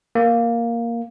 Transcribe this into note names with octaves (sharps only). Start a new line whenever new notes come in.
A#3